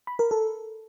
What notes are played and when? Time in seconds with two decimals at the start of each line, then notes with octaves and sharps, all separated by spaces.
0.07 B5
0.19 A#4
0.31 A4